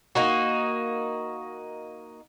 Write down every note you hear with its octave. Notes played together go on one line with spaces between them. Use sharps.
A#3 D#4 F#4